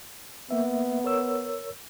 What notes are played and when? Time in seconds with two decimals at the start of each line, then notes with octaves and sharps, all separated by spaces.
0.51 A#3 B3 E5
1.04 A#4 C#5 E6